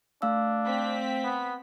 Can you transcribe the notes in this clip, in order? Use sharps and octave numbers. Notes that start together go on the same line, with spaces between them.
A3 D4 F5 E6
C4 B6
B3